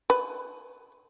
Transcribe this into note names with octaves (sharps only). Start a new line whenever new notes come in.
B4